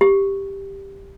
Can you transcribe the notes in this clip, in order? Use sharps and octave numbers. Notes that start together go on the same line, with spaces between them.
G4